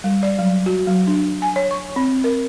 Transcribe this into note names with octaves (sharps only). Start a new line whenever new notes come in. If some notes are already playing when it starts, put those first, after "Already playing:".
G3
D5
F#3
F#4
F#3
D4
G#5
C#5
C#6
C4
A#4